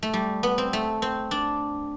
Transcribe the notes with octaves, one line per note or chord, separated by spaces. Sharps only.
A3
G3
B3
C4
A3
C4
D4